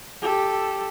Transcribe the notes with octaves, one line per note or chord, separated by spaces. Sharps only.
G4 A4